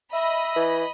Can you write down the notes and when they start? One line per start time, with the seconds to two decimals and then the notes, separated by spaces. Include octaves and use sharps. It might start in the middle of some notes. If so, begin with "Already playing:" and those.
0.13 D#5 E5 B5
0.56 E3